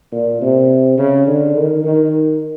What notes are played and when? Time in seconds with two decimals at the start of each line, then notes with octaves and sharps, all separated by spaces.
0.12 A#2
0.41 C3
0.98 C#3
1.27 D3
1.56 D#3
1.84 D#3